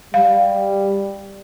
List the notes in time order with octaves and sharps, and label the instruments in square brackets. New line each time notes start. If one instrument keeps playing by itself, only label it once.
[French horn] G3 [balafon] F5